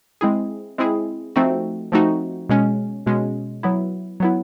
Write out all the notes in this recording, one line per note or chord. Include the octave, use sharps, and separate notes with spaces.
G#3 C4 E4 G#4
G#3 C4 E4 G#4
F3 A3 C4 D#4 F#4
F3 A3 C4 D#4 F#4
B2 G#3 C#4
B2 G#3 C#4
F#3 B3 E4
F#3 B3 E4